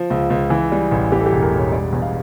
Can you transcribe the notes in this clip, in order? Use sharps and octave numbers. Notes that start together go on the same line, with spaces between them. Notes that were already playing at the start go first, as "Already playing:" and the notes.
Already playing: F3
C#2
C#2
E3
G3
A1
E3 G4
A4
G4
E1
A#4
E1 C#5
G3 D5
E2
F5